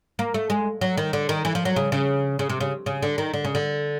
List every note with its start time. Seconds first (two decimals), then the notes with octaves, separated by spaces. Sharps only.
0.19 A#3
0.34 A3
0.50 G#3
0.81 F#3
0.98 D#3
1.13 D3
1.29 D#3
1.45 E3
1.55 F3
1.65 F#3
1.76 C#3
1.92 C#3
2.39 C#3
2.50 C3
2.61 C#3
2.86 C#3
3.03 D3
3.18 D#3
3.34 D3
3.45 C#3
3.55 D3